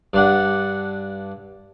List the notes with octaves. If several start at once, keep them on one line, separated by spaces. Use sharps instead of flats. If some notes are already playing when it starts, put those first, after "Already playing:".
G2 D4 F#5